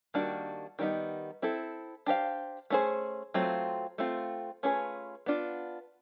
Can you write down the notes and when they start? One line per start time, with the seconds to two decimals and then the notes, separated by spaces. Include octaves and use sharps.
0.14 D#3 G3 A#3 D4 F#4
0.79 D#3 G3 B3 D#4
1.42 C4 E4 A4
2.06 D4 G4 C5 F5
2.70 A3 C#4 F4 G#4 C5
3.34 F#3 A3 C4 F4
3.98 A3 C4 F4
4.63 A3 C#4 F4 G#4 B4
5.26 B3 D4 F4